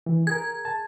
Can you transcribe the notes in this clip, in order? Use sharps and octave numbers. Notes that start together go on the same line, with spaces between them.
E3
G#4 A#4 G#6
A5